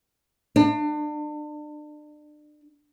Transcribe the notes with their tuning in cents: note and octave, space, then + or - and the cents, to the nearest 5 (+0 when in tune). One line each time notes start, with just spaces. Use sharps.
D4 +35